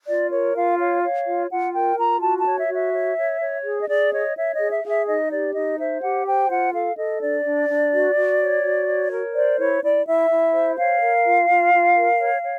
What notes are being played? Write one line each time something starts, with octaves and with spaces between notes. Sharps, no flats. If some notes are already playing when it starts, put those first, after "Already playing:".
F4 D5
A#4 C#5
F4 F5
C#5 F5
C#5
F4
F4 F#5
A#4 G5
F4 A#5
F#4 A5
A5
C#5
E5
F#4
E5
C#5
C#5
C#5
G#4
D#5
G#4 D5
C#5 D#5
C#5 E5
D#5
G#4
E5
G#4 F5
E5
D#4 D#5
G4 D5
D#4 D#5
C5 E5
G4 F#5
C5 G5
F4 F#5
A4 F5
A4 D#5
D4 D5
D4
D4
F#4
F#4
C#5
F#4
C#5
A#4
C5 D5
E4 C#5
E4 D5
E4 E5
E4
C5
C#5 F5
A#4
F4
F4
F4
A#4
C#5
C#5